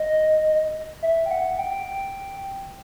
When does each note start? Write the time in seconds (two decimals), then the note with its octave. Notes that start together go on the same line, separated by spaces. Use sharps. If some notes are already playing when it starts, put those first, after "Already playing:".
Already playing: D#5
1.03 E5
1.26 G5
1.31 F#5
1.58 G5